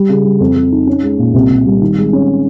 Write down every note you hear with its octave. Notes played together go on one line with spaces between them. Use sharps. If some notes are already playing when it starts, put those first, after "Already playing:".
Already playing: G3
C#3
G3
F2
F2
D#4
C#4
G#3
A#2
C2
C2
G3
D#3
G#3
C#4